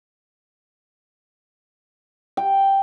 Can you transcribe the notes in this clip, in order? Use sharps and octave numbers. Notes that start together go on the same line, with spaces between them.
G5